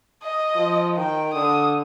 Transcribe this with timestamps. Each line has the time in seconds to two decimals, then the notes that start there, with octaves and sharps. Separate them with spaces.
0.23 D#5
0.56 F3
0.97 D#3 G5
1.33 D3 D#6